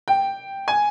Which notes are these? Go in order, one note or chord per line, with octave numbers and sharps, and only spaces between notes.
G5
G#5